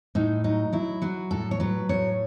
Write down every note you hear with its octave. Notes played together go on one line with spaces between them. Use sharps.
A2 D#4
F#3 D#4
F#3 E4
F#3 F#4
A2 A4
C#5
F#3 B4
A2 C#5